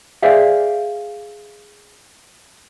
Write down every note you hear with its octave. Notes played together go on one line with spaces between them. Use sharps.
G#4 C5 D5 E5 F5